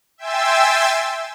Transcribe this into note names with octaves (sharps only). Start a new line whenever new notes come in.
E5 G5 G#5 C6 E6 A6